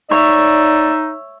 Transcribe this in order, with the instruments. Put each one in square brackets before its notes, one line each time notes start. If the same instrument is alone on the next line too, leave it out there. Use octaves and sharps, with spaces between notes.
[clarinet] D#4 [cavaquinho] C#5 [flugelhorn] D5 [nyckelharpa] E5